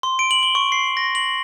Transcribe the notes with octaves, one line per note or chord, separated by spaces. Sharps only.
C6
D7
F#7
G7
C#6
C7
A#6
F#7